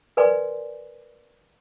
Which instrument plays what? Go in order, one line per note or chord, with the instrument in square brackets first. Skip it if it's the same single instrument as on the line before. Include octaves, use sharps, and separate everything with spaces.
[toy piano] A#4 B4 D5 G#5 C6